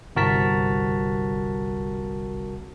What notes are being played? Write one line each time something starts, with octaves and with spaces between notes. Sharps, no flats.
G1 C2 F#4 A#4 A5 B6